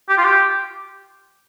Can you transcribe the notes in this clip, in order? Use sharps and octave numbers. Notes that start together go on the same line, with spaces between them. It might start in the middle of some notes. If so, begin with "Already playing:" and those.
G4
F4
G4